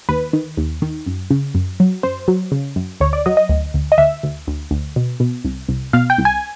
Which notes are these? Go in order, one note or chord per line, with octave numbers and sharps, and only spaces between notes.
D#2 B4
D#3
D#2
D#3
F#2
C#3
F#2
F#3
F#2 C5
F#3
C#3
F#2
D2 C#5
D5
F#3 D#5
D#5
D2
D2
D#5
D2 E5
D2
D2
D2
B2
B2
C2
C2
B2 F5
G5
C2
G#5